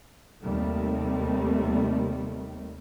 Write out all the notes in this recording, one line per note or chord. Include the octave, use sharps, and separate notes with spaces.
D#2 C3 D#3 G3 A3